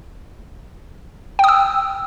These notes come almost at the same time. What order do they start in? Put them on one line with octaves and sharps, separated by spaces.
G5 D#6 E6